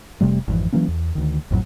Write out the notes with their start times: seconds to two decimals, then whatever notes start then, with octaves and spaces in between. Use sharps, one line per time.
0.21 F1 C3 G3 A3
0.48 G#1 F2 E3
0.72 E3 F#3 A#3 C#4
0.88 E2
1.15 D2 D#3
1.51 A1 F2 A2 F#3